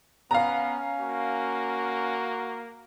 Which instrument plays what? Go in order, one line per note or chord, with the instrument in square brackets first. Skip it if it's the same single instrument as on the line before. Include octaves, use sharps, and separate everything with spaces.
[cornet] B3 [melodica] C#4 [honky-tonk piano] F5 A#5
[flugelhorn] A#3 [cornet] F#4